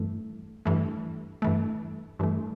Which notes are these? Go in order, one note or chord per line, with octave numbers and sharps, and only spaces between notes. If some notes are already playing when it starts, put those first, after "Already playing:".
Already playing: G2 E3 A3
G2 E3 A3
G2 E3 A3
G2 E3 A3